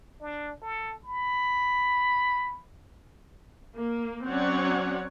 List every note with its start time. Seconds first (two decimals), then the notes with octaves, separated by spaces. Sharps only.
0.20 D4
0.62 A4
1.05 B5
3.76 A#3
4.27 F#3 C4 C#4 C#5 D5 F#5